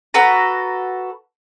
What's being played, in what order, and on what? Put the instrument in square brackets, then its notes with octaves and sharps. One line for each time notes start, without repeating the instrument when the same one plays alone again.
[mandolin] F#4 A4 B4 A#5